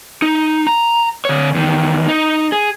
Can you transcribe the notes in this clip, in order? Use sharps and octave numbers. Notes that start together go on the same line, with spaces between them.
D#4
A#5
D3 C#5
E2 D#3
D#4
G#4